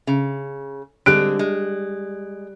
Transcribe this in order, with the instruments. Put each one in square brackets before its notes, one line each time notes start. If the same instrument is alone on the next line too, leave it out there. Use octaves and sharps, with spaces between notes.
[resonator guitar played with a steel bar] C#3
[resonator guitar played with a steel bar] D3 G#3 C4 [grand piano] G3 F#6 D7
[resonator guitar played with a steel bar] G#3